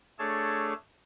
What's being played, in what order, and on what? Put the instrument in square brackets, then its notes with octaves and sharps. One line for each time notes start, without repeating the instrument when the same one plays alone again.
[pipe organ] A3 D4 G#4 A4 C#5 A5